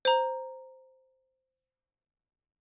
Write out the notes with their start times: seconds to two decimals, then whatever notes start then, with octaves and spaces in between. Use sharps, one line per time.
0.05 C5 A#5